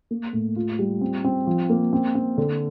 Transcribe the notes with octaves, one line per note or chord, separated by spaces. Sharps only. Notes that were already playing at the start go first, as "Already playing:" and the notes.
A#3
A2
F4
G3
C4
C4
F3
A#3
C4
C4
D3